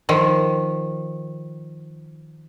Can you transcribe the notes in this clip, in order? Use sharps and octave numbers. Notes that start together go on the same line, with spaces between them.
D#3 F3